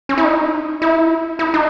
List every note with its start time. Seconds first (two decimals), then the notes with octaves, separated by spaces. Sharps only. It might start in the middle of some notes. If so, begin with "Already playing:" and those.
0.09 C#4
0.18 E4
0.24 D#4
0.82 E4
1.39 E4
1.54 D#4